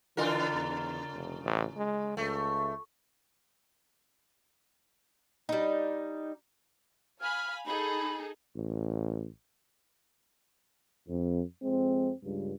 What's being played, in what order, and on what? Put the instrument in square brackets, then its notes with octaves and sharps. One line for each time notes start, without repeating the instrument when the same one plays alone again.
[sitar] C#3 F4 A#4 [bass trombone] E3
[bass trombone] E2
F1
A1
G#3
[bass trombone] C#2 [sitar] A3
[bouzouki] G3 D#4
[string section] F5 G#5 B5 [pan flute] F6
[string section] D#4 G#4 A4 [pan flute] B5
[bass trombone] A1
[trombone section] F2
F2 G#3 C4
C#2 G2